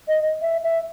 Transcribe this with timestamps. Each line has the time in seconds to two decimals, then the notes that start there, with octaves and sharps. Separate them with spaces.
0.08 D#5
0.42 E5
0.63 E5